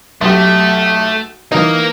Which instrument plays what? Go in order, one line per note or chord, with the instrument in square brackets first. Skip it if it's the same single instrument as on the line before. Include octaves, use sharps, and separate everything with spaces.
[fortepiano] B1 G4 [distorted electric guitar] A3
[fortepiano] E3 D#4 [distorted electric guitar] A#3 A#4